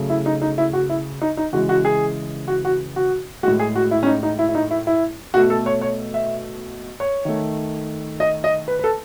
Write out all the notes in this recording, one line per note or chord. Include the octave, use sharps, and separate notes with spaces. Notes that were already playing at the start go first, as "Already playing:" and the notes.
Already playing: C#3 F#3 A3
E4
D#4
D#4
E4
F#4
E4
D#4
D#4
C#3 E3 G#3 F#4
F#4
G#4
F#4
F#4
F#4
A2 G#3 F#4
G#4
F#4
E4
C#4
D#4
D#4
E4
E4
D#4
E4
E4
B2 A3 F#4
A4
C#5
C#5
E5
C#5
D#3 A3
D#5
D#5
B4
B4
A4